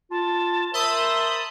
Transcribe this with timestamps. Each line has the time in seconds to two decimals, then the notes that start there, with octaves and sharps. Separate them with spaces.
0.11 F4 A5
0.74 A#4 C5 E5 A5 B5 D#6 G7